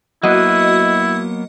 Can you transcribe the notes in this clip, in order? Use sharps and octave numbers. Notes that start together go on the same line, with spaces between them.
F#3 A#3 B3 E4 F#4 D#5